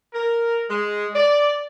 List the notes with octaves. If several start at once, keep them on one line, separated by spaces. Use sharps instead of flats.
A#4
G#3
D5